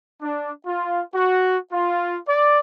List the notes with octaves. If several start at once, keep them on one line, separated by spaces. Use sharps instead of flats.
D4
F4
F#4
F4
D5